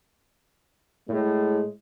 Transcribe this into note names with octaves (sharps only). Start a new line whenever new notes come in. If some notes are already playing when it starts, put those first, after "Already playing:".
A2 G#3